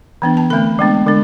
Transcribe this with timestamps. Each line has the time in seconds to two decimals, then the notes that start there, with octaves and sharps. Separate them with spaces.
0.22 E3 B3 D4
0.37 A5
0.50 D3 A3 C4 B5
0.79 G#3 B3 D4
1.07 D3 G#3 D4